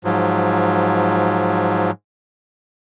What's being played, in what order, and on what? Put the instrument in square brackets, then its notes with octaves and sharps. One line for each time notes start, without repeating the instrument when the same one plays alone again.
[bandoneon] G#2 F3 F#3